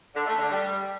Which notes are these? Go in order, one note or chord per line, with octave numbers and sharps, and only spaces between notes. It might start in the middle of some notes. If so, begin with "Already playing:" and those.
D3
A3
D3
G3